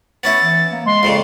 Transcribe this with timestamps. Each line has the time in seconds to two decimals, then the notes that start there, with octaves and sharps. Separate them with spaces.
0.23 B3 C#4 E4 A6
0.42 E3
0.73 A#3
0.86 G#3 C6
1.03 F2 A#2 C#3